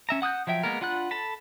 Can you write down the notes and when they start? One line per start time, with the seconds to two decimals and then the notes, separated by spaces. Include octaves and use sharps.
0.09 C#4 E5 A#5
0.22 F#5 D#6 F#6 G6
0.47 F3 F#3 E5 G5
0.63 G#3 A#3 B3 A#4
0.81 D4 F4 F#5 B5 F#6
1.11 A4 A5 B5